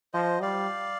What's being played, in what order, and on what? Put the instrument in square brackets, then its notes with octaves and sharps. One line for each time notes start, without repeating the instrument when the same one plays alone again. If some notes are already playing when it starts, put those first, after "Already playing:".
[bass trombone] F3 [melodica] C5 D#5
[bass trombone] G3 [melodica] D5 F5